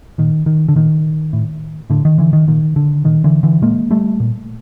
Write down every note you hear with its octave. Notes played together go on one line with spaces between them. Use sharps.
A#2 D#3
D#3
D3
A#2 D#3
A2
A2 D3
D#3
D3 E3
D#3
A#2 D#3
D3
A#2 D#3
D3 E3
D3 E3
A#2 G#3 A#3
G3 A3
A#2